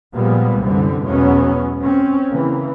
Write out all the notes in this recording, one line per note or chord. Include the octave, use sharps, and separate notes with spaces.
A#2 F3 G3 G#3 A#3 B3
C2 F#2 D3 E3 G3 C4
B1 E2 F#3 G#3 B3 C#4
C4 C#4
C#3 E3 A#3